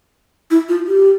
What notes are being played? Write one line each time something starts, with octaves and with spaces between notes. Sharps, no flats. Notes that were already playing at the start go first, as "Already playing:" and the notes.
E4
F4
G4